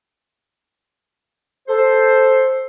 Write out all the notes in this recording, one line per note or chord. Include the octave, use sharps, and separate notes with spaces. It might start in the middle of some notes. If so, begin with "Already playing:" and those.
A4 C5